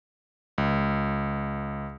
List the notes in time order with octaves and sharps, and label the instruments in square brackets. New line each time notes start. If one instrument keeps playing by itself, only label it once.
[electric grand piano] C#2